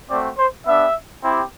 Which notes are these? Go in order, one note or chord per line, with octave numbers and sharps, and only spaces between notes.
A3 C4 F#4 D5
C5
B3 D4 G4 E5
C4 E4 G4